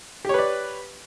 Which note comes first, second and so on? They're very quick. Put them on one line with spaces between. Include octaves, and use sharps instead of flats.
G4 C#5 B4 D5